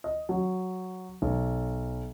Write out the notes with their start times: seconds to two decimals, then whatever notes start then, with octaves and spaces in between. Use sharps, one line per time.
0.04 D#5
0.29 F#3
1.22 B1